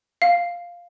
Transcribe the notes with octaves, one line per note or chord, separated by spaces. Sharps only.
F5